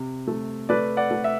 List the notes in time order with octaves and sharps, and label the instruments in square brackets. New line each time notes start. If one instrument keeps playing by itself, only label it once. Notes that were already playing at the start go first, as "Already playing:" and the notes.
Already playing: [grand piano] C3
A3
A3 B4 D5
D5 F#5
A3
E5